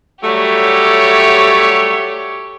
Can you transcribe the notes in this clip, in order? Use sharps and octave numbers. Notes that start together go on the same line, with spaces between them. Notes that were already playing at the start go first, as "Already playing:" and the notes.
F#3 G3 A3 G4 C#5